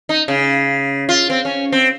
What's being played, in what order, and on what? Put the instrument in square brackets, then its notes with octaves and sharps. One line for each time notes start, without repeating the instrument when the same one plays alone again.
[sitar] D#4
C#3
F4
C4
C#4
C4